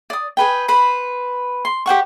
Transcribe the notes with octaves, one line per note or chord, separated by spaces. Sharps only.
D5 D#6
G#4 B4 G5
B4 C5 B5
C6
G4 C5 F#5 C#6